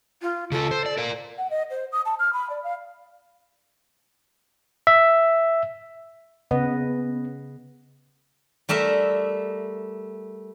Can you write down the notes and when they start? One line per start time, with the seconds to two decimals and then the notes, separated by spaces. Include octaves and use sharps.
0.22 F4
0.52 C#3 F4 A4
0.71 C5
0.86 D5
0.98 A#4 D5
1.38 F#5
1.50 D#5
1.70 C5
1.92 D#6
2.05 A5
2.19 F6
2.33 B5
2.50 D5
2.64 F5
4.87 E5
6.51 C#3 B3 B4 D#5
8.69 G3 A3 A#4 E5